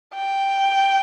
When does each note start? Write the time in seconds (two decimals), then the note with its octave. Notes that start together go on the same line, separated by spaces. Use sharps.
0.14 G5